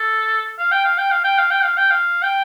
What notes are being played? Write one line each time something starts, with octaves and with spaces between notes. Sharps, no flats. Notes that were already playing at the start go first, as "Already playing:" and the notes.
Already playing: A4
F5
G5
F5
G5
F5
G5
F5
G5
F5
G5
F5
G5